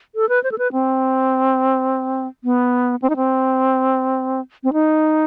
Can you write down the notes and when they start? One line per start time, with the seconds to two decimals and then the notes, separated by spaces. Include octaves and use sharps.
0.15 A4
0.29 B4
0.44 C5
0.52 A4
0.58 B4
0.73 C4
2.44 B3
3.02 C4
3.10 D#4
3.16 C4
4.64 C4
4.73 D#4